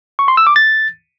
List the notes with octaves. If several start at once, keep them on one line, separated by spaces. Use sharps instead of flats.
C#6
C6
E6
D6
A6